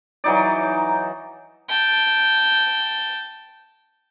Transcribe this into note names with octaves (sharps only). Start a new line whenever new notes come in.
E3 F#3 D#4 D5
G5 A5